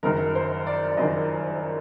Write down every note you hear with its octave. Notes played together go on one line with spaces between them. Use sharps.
F#1 F#2 D#3 A#4
C5
D5
D5
F#1 F#2 D#3 D#5